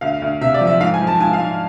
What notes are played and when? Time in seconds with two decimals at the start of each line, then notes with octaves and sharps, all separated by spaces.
0.01 D2 F5
0.22 D2
0.41 C3 E5
0.54 D5
0.61 F3
0.67 E5
0.80 G#2 F5
0.94 G#5
1.00 F3
1.07 A5
1.20 G#2 G#5
1.33 F5
1.40 G#2